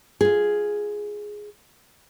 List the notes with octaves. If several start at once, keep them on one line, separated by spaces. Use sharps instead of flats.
F4 G#4